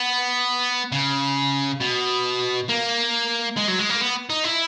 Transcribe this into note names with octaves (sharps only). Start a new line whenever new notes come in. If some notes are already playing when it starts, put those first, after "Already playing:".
Already playing: B3
C#3
B2
A#3
G#3
F#3
G#3
A#3
B3
D#4
E4